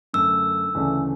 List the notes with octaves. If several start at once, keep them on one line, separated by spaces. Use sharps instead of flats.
F#2 D3 A3 E6
D2 C#3 E3 A3 D4